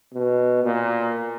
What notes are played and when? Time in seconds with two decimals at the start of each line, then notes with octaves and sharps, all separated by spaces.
0.14 B2
0.64 A#2